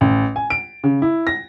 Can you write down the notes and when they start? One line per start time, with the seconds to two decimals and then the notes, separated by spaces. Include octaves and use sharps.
0.01 A1
0.36 G#5
0.50 D7
0.84 C#3
1.02 E4
1.27 A#6